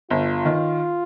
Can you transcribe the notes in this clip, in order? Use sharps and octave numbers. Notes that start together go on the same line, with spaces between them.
G1 F4
D#3